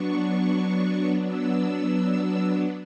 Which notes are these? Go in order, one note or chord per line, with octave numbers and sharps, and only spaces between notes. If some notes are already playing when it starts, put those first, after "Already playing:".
Already playing: F#3 B3 D4 C#6
F#3 B3 D4 E6